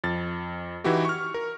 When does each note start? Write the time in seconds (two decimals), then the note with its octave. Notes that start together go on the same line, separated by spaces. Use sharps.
0.04 F2 A6
0.84 E3 D#4 E4 F#4 G4
1.05 C#6 F6
1.34 A#4